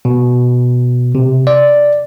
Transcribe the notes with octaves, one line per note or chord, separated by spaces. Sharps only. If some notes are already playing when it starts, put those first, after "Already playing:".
B2
C3
D5